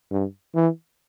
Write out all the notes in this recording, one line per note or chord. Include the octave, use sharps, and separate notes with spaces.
G2
E3